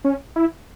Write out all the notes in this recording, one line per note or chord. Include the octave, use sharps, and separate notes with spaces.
C#4
E4